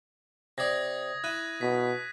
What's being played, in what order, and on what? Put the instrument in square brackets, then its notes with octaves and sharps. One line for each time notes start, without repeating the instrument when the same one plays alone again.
[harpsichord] C3 D5 [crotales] D#6 G#6 A#6
[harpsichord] E4 [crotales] F#6 D#7
[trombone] B2 [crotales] B6